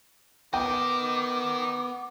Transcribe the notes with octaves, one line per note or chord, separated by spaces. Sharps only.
B3 A#4 D#5 G5 D6